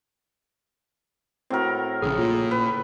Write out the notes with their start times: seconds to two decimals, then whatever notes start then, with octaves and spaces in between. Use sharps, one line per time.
1.50 A2 C4 F#4 A#4
2.02 A#1 C#3 C#4 G#4 D#6
2.18 A#2 F4
2.51 B4